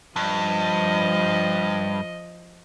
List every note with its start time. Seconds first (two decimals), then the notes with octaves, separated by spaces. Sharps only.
0.16 G2 F3 D#5